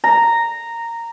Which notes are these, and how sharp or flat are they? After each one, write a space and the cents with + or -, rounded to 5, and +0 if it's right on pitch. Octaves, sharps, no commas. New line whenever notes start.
A#5 -10